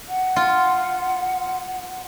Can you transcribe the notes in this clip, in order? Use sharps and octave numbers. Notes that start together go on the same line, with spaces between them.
F#5
F4